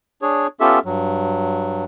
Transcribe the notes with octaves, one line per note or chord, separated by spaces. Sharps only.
D4 G#4 C#5
B3 C#4 F4 G4 A4 E5
G2 F#3